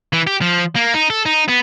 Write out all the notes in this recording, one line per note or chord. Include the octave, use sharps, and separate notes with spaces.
E3
G4
F3
A#3
D#4
A4
D#4
B3